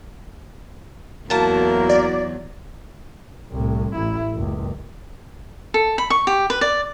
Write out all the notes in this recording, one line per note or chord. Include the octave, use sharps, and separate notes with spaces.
E2 F#3 A#3 E4 F#4 A#4 A5
D5
C2 A2
A1 E4
F#1 C#2
A4
B5
C#6
G4
B4
D5